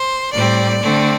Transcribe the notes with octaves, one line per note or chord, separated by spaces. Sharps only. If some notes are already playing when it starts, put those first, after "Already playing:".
Already playing: C5
A2 G3 C4 D5
D3 A3 C4